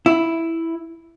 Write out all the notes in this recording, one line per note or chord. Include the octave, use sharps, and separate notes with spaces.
E4